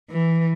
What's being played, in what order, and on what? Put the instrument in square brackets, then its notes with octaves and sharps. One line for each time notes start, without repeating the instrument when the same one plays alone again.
[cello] E3